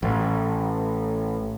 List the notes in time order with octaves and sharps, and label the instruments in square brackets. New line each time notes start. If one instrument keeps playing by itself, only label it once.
[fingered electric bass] A1